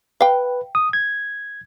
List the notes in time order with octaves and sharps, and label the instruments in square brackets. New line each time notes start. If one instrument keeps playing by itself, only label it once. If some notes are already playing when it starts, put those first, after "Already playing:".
[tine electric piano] B4 [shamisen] F5 G5
[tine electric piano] D#6
G#6